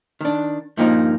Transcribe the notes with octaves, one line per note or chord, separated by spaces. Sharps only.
D#3 D4
G2 A#2 F3 A#3 D4 D#4